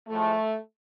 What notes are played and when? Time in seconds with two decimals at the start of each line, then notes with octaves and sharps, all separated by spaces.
0.09 A2 F3 G#3 A3